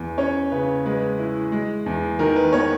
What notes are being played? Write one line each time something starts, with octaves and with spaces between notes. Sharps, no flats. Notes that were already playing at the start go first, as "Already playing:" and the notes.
Already playing: E2
C#4 C#5
C#3 B4
G#3 B4
E4
G#3
E2
D#3 A#4
B4
B3 C#5